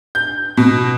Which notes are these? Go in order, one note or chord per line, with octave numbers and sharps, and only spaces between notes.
G6
B2